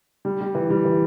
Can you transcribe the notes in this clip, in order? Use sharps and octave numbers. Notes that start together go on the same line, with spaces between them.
G3
G3
E3
G3
E3